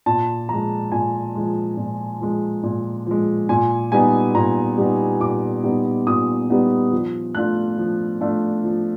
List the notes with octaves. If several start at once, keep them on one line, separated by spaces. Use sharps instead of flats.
A#2 A5
F3 G#3 A#5
A#2 G#5
F3 G#3
A#2
F3 G#3
A#2
F3 G#3
A#2 G#5
G3 B3 D#4 G#5
A#2 A#5
G3 B3 D#4
A#2 D6
G3 B3 D#4
A#2 D#6
G3 B3 D#4
F3
A3 D4 F4 F#6
F3
A3 D4 F4
F3